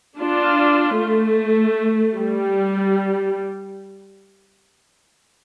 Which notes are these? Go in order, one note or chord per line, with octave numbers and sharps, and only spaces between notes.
D4 F4
A3
G3